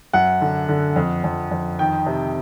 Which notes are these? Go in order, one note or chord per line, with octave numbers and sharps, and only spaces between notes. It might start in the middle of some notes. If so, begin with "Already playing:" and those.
F#2 F#5
D3
D3
F2
F2
F2
D#3 G5
C3